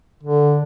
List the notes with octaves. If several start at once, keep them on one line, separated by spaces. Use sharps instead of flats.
D3